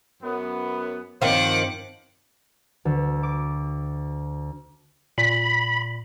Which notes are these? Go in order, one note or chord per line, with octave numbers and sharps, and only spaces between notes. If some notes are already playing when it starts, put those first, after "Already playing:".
F#2 B3
G2 D#3 F3 C4 C5 C#5 F#5 D6
D2
D6
A#2 B5